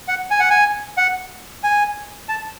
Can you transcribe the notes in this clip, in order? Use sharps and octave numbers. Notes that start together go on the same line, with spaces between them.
F#5
G#5
F#5
G#5
F#5
G#5
A5